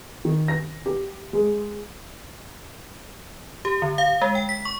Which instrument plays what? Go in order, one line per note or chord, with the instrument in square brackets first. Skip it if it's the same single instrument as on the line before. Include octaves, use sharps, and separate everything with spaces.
[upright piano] D#3
A#6
G4
G#3
[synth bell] G4
D3
F5
G#3
G5
B6
C#6